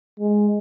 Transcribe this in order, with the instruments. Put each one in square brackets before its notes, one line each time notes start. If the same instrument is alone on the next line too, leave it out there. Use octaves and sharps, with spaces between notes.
[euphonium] G#3